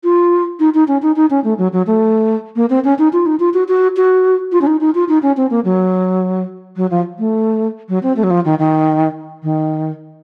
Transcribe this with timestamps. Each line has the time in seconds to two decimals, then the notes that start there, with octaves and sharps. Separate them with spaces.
0.04 F4
0.60 D#4
0.74 D#4
0.88 C#4
1.02 D#4
1.16 D#4
1.30 C#4
1.44 A3
1.58 F#3
1.73 F#3
1.87 A3
2.56 A#3
2.70 C4
2.85 C#4
2.99 D#4
3.13 F4
3.26 D#4
3.40 F4
3.54 F#4
3.68 F#4
3.97 F#4
4.52 F4
4.61 C#4
4.67 D#4
4.81 D#4
4.95 F4
5.09 D#4
5.22 C#4
5.37 C4
5.51 A#3
5.65 F#3
6.76 F#3
6.91 F3
7.19 A3
7.89 F#3
8.03 C4
8.17 A3
8.24 F#3
8.30 F3
8.45 D#3
8.59 D#3
9.43 D#3